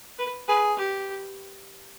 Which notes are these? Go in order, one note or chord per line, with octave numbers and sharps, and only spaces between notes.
B4
G#4 B4
G4